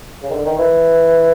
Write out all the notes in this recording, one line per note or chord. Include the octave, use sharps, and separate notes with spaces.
C#3
D#3
D3
D#3
E3